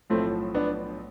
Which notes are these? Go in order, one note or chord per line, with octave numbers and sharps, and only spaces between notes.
B1 A2 F3 A3 C4
B3 D4